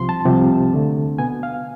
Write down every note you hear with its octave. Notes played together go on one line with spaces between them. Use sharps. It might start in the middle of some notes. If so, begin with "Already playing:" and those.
Already playing: C2 C3 F3 C6
A5
C2 C3 F3
D2 D3 A3
B2 B3 G#5
F5